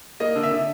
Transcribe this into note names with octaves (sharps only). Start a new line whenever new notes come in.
A#3 D#5
D3
E5
D3